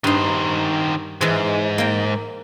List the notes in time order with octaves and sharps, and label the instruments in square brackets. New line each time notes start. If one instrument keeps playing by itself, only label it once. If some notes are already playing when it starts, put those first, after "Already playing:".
[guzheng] G2 D#4 [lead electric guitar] D#3 C5
[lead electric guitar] G#2 [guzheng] E3 G#3
[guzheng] A#3 G5